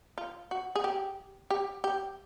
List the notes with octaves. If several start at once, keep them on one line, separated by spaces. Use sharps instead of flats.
F4
F#4
G#4
G4
G4
G4